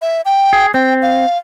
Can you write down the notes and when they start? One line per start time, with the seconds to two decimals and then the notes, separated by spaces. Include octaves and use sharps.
0.02 E5
0.25 G5
0.53 G#4
0.74 C4 G5
1.02 F5